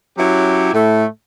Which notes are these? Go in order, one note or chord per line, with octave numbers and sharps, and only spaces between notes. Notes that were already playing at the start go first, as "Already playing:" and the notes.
F#3 C#4 E4 F#4 G4
A2 A3